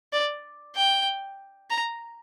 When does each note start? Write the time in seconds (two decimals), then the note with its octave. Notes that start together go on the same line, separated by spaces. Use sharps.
0.13 D5
0.76 G5
1.70 A#5